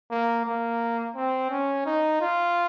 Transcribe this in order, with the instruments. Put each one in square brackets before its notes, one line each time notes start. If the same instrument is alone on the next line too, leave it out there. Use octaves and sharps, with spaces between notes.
[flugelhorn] A#3
A#3
C4
C#4
D#4
F4